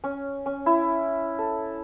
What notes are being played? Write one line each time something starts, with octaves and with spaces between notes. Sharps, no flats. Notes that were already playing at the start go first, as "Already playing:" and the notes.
C#4
C#4
E4
A4